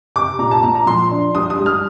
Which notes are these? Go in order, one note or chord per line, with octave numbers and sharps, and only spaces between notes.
C3 D6
A#2 A#5
A5
A#2 A#5
A#5
F3 C6
D4
G3 D#6
D#6
G3
F6